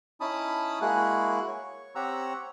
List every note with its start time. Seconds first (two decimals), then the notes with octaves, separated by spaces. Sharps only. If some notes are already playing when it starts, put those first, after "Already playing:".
0.21 C#4 D#4 E4 A5 B5 D#6
0.81 G#3 A#3 E4 F#4 G#4 F#6
1.48 C#5
1.95 C4 G4 C#5 F#5 A#5 E6